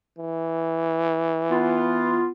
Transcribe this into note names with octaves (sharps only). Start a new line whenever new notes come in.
E3
B3 F4